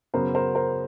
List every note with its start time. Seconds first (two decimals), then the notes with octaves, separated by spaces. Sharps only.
0.14 F#2 C#3 F#3 B3 A#4 C5
0.35 A#4 C5
0.55 A#4 C5